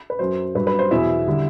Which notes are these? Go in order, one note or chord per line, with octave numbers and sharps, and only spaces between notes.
B4
F#2 F#3 C5
G2 F#3 B4
B4
C5
E2 B2 F#3 E4 E5
D3 G3